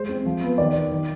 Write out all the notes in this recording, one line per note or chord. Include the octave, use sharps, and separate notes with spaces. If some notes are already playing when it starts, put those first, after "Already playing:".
Already playing: G#3 C5
C4
F3
B3
D#3 D5
D#3
D#3